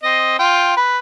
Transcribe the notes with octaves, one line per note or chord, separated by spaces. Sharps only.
C4 D#5
F4 G5
B4